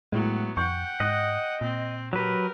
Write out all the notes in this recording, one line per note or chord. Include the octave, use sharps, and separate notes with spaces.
A2 F#3 G#3 B3 E4
F2 F#5 G5 C#6 G6
G#2 D#5 F#6
A#2 C4
F#3 G4 A#4 B4